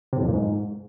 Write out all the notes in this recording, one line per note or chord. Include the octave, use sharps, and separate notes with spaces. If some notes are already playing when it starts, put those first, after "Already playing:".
C3
A2
F2
A#2
G#2